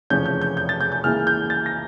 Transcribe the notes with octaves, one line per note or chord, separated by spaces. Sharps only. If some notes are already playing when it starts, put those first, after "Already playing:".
F1 E2 C#3 F3 C#4 G6
G6
G6
G6
A6
G6
G6
C#2 C#3 E3 A#3 F6
G6
A6
A#6